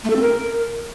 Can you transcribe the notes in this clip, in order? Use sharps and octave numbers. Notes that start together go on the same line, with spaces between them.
A3
A4
C4
A#4